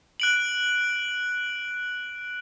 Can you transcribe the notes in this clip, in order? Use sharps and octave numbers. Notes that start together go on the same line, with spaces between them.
F#6 D7 F#7